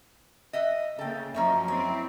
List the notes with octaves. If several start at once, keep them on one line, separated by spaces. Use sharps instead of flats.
D#5 E5 F#5
C#3 A#3 A4 G5
F#2 F3 A#3 C#5 D#5 E5
C4 E4 C#5